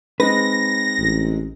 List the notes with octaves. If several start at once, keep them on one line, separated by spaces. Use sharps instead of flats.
G#3 C4 D#4 B4 A#6
A1